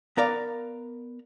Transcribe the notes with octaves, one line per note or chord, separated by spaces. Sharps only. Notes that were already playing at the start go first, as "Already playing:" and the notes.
B3 A#4 D5 F5